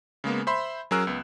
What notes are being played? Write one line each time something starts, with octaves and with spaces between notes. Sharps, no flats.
C#3 G#3 A#3 B3
C5 E5 B5 C6
F#3 C#4 G#4 A#4 E6 F#6
C#2 B3